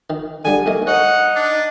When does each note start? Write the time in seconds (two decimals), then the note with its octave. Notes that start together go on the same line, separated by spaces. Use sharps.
0.10 D#3
0.45 D3 G3 D4 G#5
0.66 B1 A3 A#3 D#5
0.87 D#4 C#5 F#5
1.36 D4